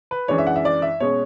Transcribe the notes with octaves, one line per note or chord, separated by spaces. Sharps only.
B4
F#2 E3 G#3 D4 C#5
E5
F#5
E5
D5
E5
B2 G#3 C#4 C#5